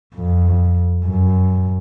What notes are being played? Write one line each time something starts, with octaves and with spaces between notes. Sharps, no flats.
F2
F#2